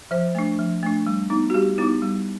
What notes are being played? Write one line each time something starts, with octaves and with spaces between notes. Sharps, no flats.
F3 C5
A3 D4
F3
A3 D4
G3
B3 D#4
F#4
G3 G4
B3 D#4 E4
G3